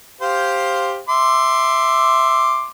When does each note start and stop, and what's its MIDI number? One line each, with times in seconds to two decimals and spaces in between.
0.21 0.99 67
0.21 0.99 72
0.21 0.99 77
1.09 2.69 76
1.09 2.69 84
1.09 2.69 86